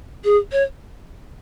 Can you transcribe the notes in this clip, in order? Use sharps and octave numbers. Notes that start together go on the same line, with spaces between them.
G#4
C#5